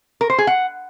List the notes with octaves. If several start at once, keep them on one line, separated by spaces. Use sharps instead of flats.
A#4
C5
G#4
F#5